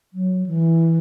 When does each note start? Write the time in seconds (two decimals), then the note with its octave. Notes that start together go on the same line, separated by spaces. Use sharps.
0.13 F#3
0.46 E3